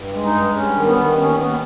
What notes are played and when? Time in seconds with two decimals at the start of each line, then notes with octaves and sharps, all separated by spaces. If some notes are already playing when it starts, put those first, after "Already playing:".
Already playing: G2
0.13 G#3
0.23 D#4
0.34 G2
0.55 G2 C#4
0.75 D#3
0.86 B3
0.96 D#3
1.17 D#2 C#4
1.37 D#2 B3